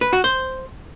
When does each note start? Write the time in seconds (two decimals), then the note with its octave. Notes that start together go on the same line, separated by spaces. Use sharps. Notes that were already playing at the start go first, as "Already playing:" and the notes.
0.01 B4
0.13 F#4
0.24 C5